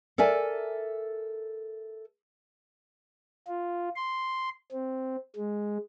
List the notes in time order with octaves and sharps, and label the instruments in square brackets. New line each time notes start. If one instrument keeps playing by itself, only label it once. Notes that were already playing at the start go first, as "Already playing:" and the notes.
[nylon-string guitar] A4 A#4 D5 E5 G#5
[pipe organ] F4
C6
C4
G#3